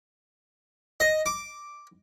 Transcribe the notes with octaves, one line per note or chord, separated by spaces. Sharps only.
D#5
D6